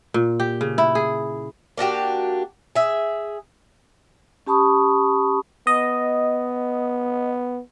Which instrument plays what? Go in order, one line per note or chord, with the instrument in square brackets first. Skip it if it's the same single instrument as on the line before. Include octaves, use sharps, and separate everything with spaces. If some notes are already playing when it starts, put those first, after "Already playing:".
[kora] A#2
G4
C#3
E4
G#4
[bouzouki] A#3 D4 F#4 G4
G#4 E5
[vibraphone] C#4 G4 A5 B5 C#6 D#6
[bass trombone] B3 [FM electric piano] D#5